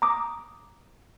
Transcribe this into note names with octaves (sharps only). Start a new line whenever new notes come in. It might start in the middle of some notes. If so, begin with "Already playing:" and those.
A#5 D6 D#6